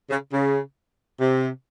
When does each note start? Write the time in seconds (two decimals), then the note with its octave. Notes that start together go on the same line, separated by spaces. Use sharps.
0.10 C#3
0.32 C#3
1.21 C3